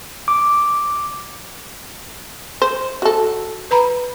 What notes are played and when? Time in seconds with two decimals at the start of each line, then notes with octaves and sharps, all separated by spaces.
0.28 D6
2.62 C5
3.02 F#4 A4
3.71 B4 A#5 B5